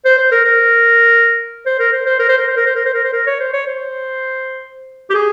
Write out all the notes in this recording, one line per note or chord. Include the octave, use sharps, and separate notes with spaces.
C5
C5
A#4
A#4
C5
A#4
C5
C5
A#4
C5
A#4
C5
A#4
C5
A#4
C5
A#4
C5
A#4
C#5
C5
C#5
C5
G4
G#4